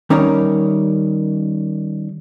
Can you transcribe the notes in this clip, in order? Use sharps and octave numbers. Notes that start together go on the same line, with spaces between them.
D#3 G3 C#4 D#4 A#4 C#5